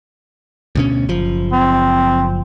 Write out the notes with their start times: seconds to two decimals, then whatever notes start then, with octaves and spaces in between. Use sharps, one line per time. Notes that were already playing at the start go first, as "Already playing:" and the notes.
0.75 D2 B2 C#4
1.09 F#1 F3
1.52 C4